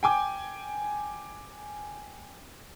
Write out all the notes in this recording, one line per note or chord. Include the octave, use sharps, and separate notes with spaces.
G5 G#5 D6